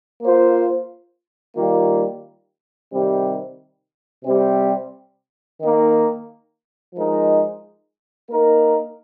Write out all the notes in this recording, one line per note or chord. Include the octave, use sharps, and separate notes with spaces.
A#3 F4 C5
D#3 G3 A#3 F4
C3 D#3 G3 C4
C3 G3 C4 G4
D#3 A#3 D#4
F3 G#3 D#4 A#4
A#3 D#4 A#4